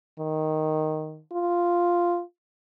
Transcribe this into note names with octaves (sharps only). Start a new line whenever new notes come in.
D#3
F4